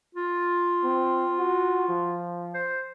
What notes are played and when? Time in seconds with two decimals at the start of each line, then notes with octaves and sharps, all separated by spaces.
0.15 F4
0.84 C4
1.39 F#4
1.89 F3
2.54 C5